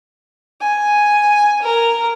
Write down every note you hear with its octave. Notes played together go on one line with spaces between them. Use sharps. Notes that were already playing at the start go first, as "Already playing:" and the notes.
G#5
A#4